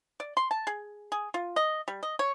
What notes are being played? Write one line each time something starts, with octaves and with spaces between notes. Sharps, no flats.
D5
C6
A5
G#4
G#4
F4
D#5
G3
D#5
C#5